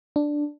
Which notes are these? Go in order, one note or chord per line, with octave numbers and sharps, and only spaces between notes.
D4